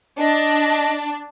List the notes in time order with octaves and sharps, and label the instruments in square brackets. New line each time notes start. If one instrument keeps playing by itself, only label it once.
[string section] D4 [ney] D#5